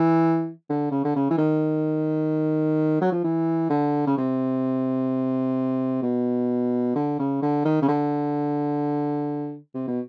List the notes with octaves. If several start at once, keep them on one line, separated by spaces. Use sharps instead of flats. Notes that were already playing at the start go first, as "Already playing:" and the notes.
Already playing: E3
D3
C#3
D3
C#3
E3
D#3
F#3
F3
E3
D3
C#3
C3
B2
D3
C#3
D3
D#3
C#3
D3
C3
B2